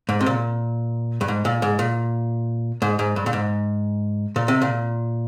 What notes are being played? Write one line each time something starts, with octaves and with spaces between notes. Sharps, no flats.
G#2
C3
A#2
G2
G#2
A#2
G#2
A#2
G#2
G#2
G2
A#2
G#2
A#2
C3
A#2